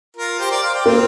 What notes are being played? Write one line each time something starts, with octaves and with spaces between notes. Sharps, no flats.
F4 A#4
G4 C5
A#4 D5
C5 F5
D5 G5
A#3 C4 F4